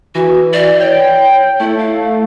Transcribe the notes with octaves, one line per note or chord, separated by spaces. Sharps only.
E3 F#4
D5
C#5 G5
A3 E4
F5